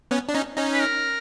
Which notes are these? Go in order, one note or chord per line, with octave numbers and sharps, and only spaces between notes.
B3 C#4
D4
C#4 D#4
C#4 D#4
B4
A#4